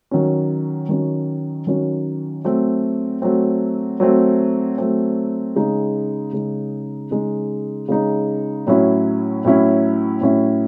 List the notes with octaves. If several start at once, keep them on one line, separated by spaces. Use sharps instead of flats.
D#3 F#3 C#4
D#3 F#3 C#4
D#3 F#3 C#4
F#3 A3 C4
F#3 A3 C4
F#3 A3 C4
F#3 A3 C4
C#3 G#3 D#4
C#3 G#3 D#4
C#3 G#3 D#4
C#3 G#3 D#4
A2 F#3 C#4 E4
A2 F#3 C#4 E4
A2 F#3 C#4 E4